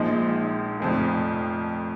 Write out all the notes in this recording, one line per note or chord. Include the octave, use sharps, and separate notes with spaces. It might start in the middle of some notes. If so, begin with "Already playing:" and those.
Already playing: A#1 A#2 F3 G#3 D#4
F1 F2 F3